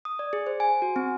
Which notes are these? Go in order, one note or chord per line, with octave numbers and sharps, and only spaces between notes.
D#6
D5
G#4
C5
G#5
F#4
C4